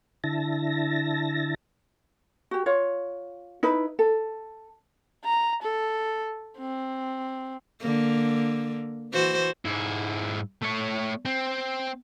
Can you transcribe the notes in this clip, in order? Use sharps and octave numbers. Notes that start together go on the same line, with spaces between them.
D3 E4 A5 A#6
F#4 G4
F4 C#5
D#4 E4 B4
A4
A#5
A4
C4
D3 A#3
E3 F#4 C5
G#2 E4
A3 C#5
C4